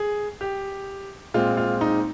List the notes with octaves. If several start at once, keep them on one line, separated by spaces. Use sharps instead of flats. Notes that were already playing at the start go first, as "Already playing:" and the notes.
Already playing: G#4
G4
A#2 G#3 C4 F4
F4
D#4